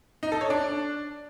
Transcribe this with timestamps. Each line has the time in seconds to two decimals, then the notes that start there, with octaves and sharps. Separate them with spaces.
0.23 D#4
0.32 A4
0.41 C#5
0.50 D4